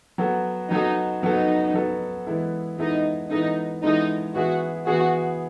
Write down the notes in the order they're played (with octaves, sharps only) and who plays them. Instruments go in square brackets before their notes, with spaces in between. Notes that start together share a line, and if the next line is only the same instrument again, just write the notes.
[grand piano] F#3 B3 F#4 A4
[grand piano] F#3 B3 F#4 A4 [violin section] D#4
[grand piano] F#3 B3 F#4 A4 [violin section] D#4
[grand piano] F#3 B3 F#4 A4
E3 G#3 B3 E4 A4
[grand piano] E3 G#3 B3 E4 A4 [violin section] D#4
[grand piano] E3 G#3 B3 E4 A4 [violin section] D#4
[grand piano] E3 G#3 B3 E4 A4 [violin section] D#4
[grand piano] E3 B3 E4 G#4 [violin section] F#4
[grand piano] E3 B3 E4 G#4 [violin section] F#4